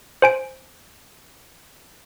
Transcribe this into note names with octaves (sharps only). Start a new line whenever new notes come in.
C5 G#5 D7